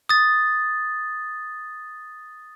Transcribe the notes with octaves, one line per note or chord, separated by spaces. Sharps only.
D#6 A6